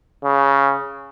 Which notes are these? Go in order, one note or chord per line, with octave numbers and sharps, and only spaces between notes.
C#3